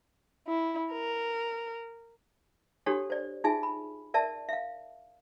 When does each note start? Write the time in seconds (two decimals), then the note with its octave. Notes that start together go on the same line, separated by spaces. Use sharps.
0.46 E4
0.92 A#4
2.86 D4 F#4 G4 A4 C#5
3.10 C5 D5
3.44 D#4 F4 G#4 E5 G#5
3.63 B5
4.14 A#4 D5 E5 A5
4.49 E5 F5